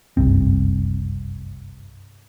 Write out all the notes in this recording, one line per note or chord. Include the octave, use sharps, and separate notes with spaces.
F#1 C2 G2 C4